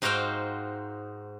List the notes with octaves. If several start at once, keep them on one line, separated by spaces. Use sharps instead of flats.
G#2 D#4 F#4 C5 F5 G5